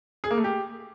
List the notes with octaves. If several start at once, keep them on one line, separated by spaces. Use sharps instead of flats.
G#4
A#3
A3
G4